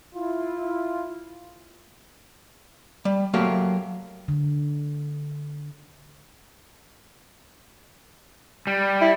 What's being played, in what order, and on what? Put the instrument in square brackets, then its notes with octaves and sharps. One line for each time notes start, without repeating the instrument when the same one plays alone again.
[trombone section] E4 F4
[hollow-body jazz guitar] G3
F#3 A3 A#3 G4 E5 F5
[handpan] D3
[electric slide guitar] G3
[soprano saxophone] E4